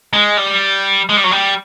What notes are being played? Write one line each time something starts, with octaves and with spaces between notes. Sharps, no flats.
G#3
G3
G#3
G3
F#3
G3